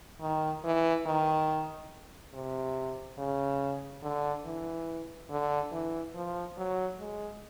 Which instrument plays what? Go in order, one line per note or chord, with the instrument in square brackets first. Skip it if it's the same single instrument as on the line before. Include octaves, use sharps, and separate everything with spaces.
[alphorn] D#3
E3
D#3
C3
C#3
D3
E3
D3
E3
F3
F#3
G#3